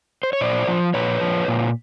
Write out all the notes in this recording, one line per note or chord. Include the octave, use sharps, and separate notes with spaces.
C5
C#5
A#2 C5 D5
F3
A#2 B4 C#5
F3
A#2